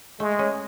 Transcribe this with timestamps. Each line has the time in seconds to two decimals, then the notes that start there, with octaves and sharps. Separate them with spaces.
0.20 G#3 A3
0.39 C#4